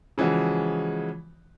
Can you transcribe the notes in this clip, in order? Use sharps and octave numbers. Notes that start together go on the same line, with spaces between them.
C#3 E3 F3 G#3 F#4